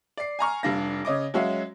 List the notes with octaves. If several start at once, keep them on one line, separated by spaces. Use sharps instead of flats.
D5 C7
G#5 A#5 C#6 F6
F1 G3 D4 F5 A#6
C#3 C#5 D#5 D6
F#3 G#3 C#4 F#4 E5 F5